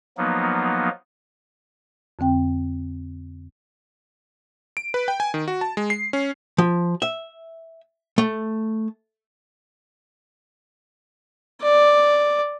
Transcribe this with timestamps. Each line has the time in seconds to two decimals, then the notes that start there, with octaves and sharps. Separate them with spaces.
0.17 F3 F#3 A#3 B3 D#4
2.19 F2 D3 C4 G5
4.77 D7
4.94 B4
5.08 G5
5.20 G#5
5.34 D#3
5.48 F#4
5.61 A5
5.77 G#3
5.90 C7
6.13 C#4
6.58 F3
7.02 E5
8.18 A3
11.62 D5